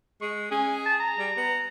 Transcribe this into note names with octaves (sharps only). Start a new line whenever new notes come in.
G#3 C#6
C#4 G#4
A5
A#5
G3
B3